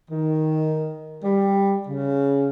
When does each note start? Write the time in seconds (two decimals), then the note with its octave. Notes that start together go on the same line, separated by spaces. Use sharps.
0.10 D#3
1.23 G3
1.87 C#3